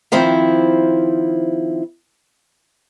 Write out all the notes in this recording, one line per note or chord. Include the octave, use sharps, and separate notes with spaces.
D#3 F3 C4 E4